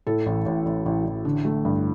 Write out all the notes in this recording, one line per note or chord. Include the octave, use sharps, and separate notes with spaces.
A2 A4
A1
A1
A1
A1
A1
D3
A3
G2